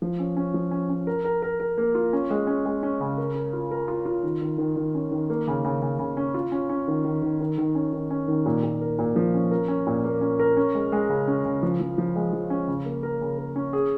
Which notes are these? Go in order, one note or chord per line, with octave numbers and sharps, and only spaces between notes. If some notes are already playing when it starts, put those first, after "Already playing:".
F3
C#4
C#4
F3
C#4
C#4
A#4
A#4
A#4
A#4
A#3
F4
C#4
G#3
C#4
G#3
C#4
C#3
A#4
A#4
F4
A#4
F4
F4
D#3
D#3
D#3
D#3
C#4
D#3
A#3
C#3
C#3
C#3
C#3
C#4
F4
C#4
C#4
D#3
D#3
D#3
D#3
D#3
C#4
D#3
C#4
D#3
A#2
A#2
A#4
A#2
F3
C#4
A#4
C#4
A#2
A#3
C#4
A#4
C#4
G#3
G#3
C#3
C#4
C#3
F3
F3
F3
G#3
F3
C#4
C#3
A#3
A#4
C#3
A#4
C#4
G#4